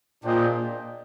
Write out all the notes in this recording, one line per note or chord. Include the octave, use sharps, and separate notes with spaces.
A#2 D4 G#4 C5 D#5 G5